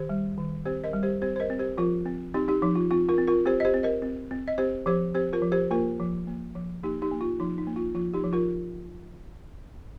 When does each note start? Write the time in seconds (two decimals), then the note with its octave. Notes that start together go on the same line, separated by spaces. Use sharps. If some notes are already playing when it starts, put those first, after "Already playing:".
Already playing: D#3 G4 C5
0.09 G3
0.38 D#3
0.65 C4 G4 C5
0.84 A#4 D#5
0.93 G3
1.03 G4 C5
1.21 C4 G4 C5
1.36 C5
1.40 A#4 D#5
1.50 C4
1.59 G4 C5
1.78 F3 F4 A#4
2.06 C4
2.34 C4 D#4 G4
2.48 D#4 G4
2.62 F3 D#4
2.76 F4
2.91 C4 F4
3.09 F4 A#4
3.18 C4
3.27 F4 A#4
3.46 C4 G4 C5
3.60 D#5
3.65 G4 C5
3.74 C4
3.83 A#4 D#5
4.02 C4
4.31 C4
4.48 D#5
4.58 C4 G4 C5
4.86 F3 G4 C5
5.14 C4 G4 C5
5.33 F4 A#4
5.42 F3
5.52 G4 C5
5.71 A#3 F4 A#4
5.99 F3
6.27 A#3
6.55 F3
6.83 A#3 D#4 G4
7.02 D#4 G4
7.11 A#3
7.21 F4
7.40 F3 D#4
7.58 D#4
7.67 A#3
7.76 F4
7.95 F3 F4
8.14 D#4 G4
8.24 F3
8.33 F4 A#4